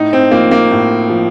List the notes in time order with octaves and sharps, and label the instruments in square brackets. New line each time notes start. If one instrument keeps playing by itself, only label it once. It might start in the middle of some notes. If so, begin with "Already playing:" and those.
Already playing: [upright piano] A2 D#4
C4
F3 A#3
A#3
A2
F3